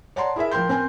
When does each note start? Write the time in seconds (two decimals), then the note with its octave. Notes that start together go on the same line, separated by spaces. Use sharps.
0.16 C#5 D5 F#5 A5 A#5 C6
0.36 E4 G#4 A#4 E5
0.51 F3 A#4 G5 C6 G6
0.69 C4 A#4 G#5 C6